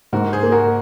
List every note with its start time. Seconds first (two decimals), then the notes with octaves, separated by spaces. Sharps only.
0.13 G#2 F#4 A#4
0.32 G#4 C5
0.43 A#3
0.52 F#4 A#4